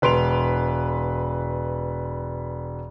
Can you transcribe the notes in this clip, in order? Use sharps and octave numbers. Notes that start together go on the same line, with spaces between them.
E1 B4 C6 D7 F7